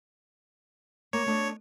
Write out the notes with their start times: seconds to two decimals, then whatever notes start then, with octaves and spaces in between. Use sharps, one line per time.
1.13 A#3 C#5
1.26 A3 D4 D#5